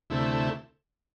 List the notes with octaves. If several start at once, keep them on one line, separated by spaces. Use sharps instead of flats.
D2 C3 A3 E4